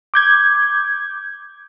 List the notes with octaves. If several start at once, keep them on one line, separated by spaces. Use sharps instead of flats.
D6 G6 G#6